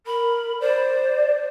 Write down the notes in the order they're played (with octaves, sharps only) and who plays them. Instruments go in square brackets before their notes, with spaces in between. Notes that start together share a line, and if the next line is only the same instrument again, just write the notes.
[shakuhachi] A#4 [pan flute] B5
[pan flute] C5 [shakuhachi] D5